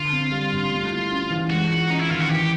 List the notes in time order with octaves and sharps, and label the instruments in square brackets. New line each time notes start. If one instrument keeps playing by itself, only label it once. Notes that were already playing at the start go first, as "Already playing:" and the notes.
Already playing: [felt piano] D3 [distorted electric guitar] F4
[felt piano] C4
G3
G2
A3
E4
C#4
E3
[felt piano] G#3 [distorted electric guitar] F#4
[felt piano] F4
[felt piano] C#4 [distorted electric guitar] D#4
[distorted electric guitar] E4
[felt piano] D#3 [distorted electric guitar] F4
[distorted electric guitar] F#4
[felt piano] E3 [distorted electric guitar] G4